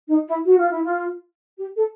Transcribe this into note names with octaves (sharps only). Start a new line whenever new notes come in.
D#4
E4
F#4
F4
E4
F4
G4
A4